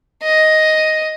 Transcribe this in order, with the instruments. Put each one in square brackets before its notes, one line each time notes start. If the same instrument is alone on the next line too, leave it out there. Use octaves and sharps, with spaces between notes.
[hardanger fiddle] D#5